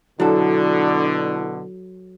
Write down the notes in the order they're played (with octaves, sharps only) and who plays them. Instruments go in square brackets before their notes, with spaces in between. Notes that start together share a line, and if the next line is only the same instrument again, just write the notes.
[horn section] B2 D3 [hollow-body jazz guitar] F#3 A4 [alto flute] D4 [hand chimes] E4